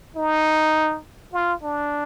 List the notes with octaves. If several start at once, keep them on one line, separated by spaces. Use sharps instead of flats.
D#4
F4
D4